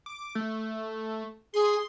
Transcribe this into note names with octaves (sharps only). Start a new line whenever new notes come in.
D6
A3
G#4 C6